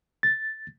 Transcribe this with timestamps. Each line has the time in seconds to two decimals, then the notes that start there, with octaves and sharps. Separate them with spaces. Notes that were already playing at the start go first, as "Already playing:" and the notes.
0.23 A6